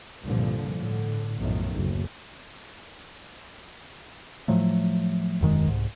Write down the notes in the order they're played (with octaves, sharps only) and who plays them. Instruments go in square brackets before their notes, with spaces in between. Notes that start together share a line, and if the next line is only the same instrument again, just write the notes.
[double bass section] C2 G2 A#2 D3 F3
A2 D3
B1 F#2 A2 D#3 F3 A3
F#1 D2
[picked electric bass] A2 F3 F#3 A3
E1 F#2 D#3 G#3
C2 G#2